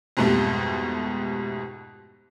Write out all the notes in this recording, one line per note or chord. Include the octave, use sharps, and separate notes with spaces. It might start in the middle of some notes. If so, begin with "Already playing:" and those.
F2 G#2 B2 G3 A3